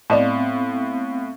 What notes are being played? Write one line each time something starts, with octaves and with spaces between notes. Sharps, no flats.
A2 B3 C4 D5 D#5 F5 A5